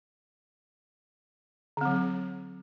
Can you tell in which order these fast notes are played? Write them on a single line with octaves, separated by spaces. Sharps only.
D3 C4 F#3